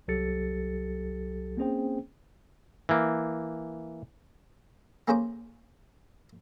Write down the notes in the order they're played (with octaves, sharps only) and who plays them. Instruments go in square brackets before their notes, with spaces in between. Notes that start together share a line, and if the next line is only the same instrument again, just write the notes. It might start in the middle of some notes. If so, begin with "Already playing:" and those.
[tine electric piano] C2 F#3 G4 A4 A6 C#7
A#3 C4 C#4 G#4 C5 G5
[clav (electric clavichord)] E3 A#3
[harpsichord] A#3 C#4 G#4 C5 A#5 D6